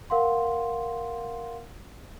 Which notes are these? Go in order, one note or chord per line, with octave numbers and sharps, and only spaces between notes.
A#4 F5 F#5 C6